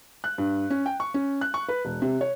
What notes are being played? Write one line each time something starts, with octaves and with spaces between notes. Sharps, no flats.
F#6
G2
C#4
G5
C#6
C#4
F#6
C#6
B4
E1
C3
C#5